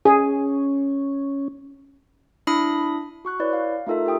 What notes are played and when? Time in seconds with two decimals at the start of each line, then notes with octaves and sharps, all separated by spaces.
0.05 C#4 G#4
2.47 D4 E4 B5 D#6
3.25 F#4 C#6 F#6
3.40 E4 B4 C#5 D5
3.53 F5
3.87 A3 D#4 F4 A4 A#4 E5
4.06 G4 A#4 G5 D#6